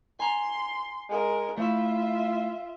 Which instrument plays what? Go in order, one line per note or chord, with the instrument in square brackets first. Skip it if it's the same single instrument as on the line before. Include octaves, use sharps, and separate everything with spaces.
[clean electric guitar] G#5 A#5 [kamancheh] C6
[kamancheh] G#3 A#4
[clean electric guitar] A3 E4 [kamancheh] F4 E5